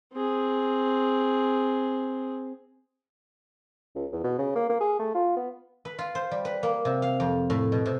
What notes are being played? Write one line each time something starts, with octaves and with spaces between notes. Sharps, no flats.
C4 G#4
C#2
E2
B2
C#3
A#3
A#3
G#4
A3
F4
B3
B4
F4
C5
G3
B4
A#3
C3
F5
F2
A2
B2
C3